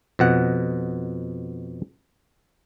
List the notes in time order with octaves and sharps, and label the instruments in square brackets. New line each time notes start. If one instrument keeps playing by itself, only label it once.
[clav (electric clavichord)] F2 B2 F#5